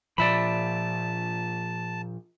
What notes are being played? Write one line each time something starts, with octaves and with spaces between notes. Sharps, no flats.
A#2 F3 D5 E5 A5 B5